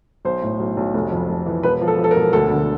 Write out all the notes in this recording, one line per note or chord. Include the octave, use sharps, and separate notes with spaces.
B1 C5
A2
B1
B1
F1
F2
F1
E3
E1 B4
F3
A4
F3
A4
A#4
E1
D2 A4
D3